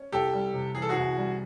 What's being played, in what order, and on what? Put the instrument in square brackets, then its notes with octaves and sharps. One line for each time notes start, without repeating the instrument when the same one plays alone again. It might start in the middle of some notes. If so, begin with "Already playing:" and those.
Already playing: [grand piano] C#4
[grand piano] C2 [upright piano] G4 A4
[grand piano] G3
C3
[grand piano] E3 [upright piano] G#4
[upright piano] A4
F#4 G#4
[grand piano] C2
G3